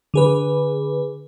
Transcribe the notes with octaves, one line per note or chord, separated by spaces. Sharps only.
D3 G#4 B4